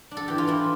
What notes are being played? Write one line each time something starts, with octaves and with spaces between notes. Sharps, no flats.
D4
A4
E3 G4
F4
E3 E4